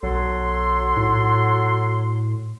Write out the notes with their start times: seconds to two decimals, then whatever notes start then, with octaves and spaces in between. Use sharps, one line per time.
0.03 B1 F#3 A4 C6
0.97 A2